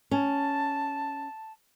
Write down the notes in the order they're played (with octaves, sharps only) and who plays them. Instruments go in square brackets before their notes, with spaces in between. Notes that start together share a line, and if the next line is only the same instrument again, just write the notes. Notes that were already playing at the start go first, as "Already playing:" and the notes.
[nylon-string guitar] C#4 [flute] A5